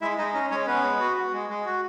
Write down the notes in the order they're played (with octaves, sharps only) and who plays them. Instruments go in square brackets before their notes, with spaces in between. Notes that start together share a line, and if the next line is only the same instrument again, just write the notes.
[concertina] G#3 E4 E5
G#3 D#4 D#5
C#4 D#4 D#5
G#3 C#4 C#5
B3 C#4 B4
G#3
F#4
F#4
G#3
G#3
F#4